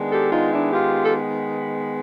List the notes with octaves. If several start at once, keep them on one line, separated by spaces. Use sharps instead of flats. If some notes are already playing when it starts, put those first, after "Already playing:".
Already playing: D#3 G#3 B3 D4
G4 A4
D#4 F4
D4 E4
F4 G4
A4